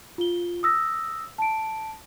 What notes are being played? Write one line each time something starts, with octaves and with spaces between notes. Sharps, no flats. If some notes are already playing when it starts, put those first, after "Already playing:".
F4 G7
D#6 E6 A#6
A5 D7